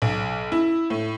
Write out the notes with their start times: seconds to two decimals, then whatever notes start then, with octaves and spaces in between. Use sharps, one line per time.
0.02 B1
0.52 E4
0.90 A2